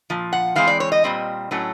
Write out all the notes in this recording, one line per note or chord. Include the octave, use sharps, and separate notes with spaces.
A#2 F3
F#5
E3 G#3 C4 F5
D5
C#5
D#5
A#2 G3 C4
A2 F#3 A3 C#4